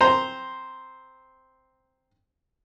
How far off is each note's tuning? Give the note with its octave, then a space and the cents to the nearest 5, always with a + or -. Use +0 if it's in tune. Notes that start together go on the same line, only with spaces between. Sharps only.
C4 +0 C5 +0 A#5 +0